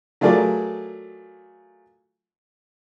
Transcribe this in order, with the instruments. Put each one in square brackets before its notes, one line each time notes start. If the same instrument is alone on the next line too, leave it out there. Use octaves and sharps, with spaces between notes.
[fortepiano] F#3 A3 F4 G#4 A#4 D5